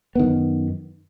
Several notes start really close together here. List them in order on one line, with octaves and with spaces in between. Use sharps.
B3 D#3 F#2